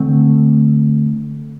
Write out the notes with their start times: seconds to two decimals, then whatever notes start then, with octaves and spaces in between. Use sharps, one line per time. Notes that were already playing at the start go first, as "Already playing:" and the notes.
Already playing: D3 A3 C4